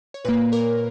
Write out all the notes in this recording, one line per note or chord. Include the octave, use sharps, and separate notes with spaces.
C#5
A#2 A#3 B4
A#4 C#5